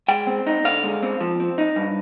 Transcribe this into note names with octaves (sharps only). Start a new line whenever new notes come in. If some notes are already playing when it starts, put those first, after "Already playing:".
G#3 G5
C4
D#4
D3 F5
G#3
C4
F3
C4
D#4
G2